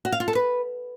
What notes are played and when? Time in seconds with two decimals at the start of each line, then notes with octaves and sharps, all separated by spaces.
0.05 F#4
0.12 F5
0.20 F4
0.28 A4
0.35 B4